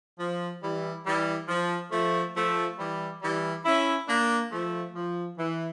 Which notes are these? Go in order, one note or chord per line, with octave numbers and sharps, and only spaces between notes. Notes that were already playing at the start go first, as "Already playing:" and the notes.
F3
E3 G3
E3 G3
F3
F3 A3
F3 A3
E3 G3
E3 G3
C#4 E4
A#3 D4
F3 A3
F3
E3